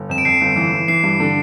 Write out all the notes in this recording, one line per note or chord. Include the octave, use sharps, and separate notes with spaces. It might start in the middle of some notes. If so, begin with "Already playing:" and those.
Already playing: G1
F2 E7
D7
F2 C7
G1
E3
E3
E3 C7
G2
D3